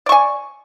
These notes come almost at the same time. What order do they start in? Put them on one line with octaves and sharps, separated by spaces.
D5 C#6 G#5